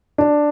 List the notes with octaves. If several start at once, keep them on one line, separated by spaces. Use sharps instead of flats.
D4